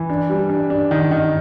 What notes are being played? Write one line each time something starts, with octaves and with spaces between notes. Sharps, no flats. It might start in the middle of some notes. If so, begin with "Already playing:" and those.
Already playing: E3
D4
G3
D4
D4
D#3
D#3